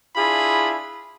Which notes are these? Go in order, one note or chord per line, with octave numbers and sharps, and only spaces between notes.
D4 E4 F4 G#4 B5